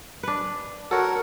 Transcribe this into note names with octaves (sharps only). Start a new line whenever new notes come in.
D4 B4
F#4 A4 A#4 C#5 F#5